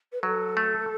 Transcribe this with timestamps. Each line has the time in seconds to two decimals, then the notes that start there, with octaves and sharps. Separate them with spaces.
0.12 B4
0.23 F#3 A4
0.57 A3